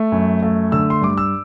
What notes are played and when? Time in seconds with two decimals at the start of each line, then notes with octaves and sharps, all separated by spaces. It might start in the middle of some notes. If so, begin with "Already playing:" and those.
Already playing: A3
0.12 F#2
0.43 A3
0.72 D3 E6
0.90 C6
1.01 G2 D6
1.18 E6